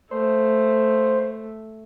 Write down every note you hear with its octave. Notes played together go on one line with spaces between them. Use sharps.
A3 C5